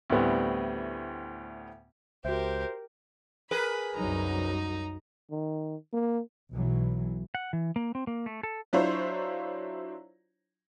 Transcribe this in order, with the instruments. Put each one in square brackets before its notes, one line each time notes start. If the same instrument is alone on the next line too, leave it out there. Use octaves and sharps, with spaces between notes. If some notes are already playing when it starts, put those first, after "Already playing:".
[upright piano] D2 A2 G3 B3 C4
[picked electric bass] C#2 [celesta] F#4 E5 [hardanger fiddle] G4 A#4 [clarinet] C5
[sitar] G#4 A#4 B4 [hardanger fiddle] B5
[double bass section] C2 F#2 F#3 [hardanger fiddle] D#4 A#5
[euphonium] D#3
A#3
[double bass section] B1 B2 E3 F#3
[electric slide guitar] F#5
E3
A#3
C4
A#3
A3
A4
[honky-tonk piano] F#3 D4 E4 F4 C5 C#5